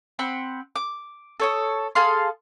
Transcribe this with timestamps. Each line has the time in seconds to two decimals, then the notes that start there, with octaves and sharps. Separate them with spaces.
0.19 C4 F#5 B5
0.76 D6
1.40 A4 C#5 D#6
1.95 G#4 A4 F5 C6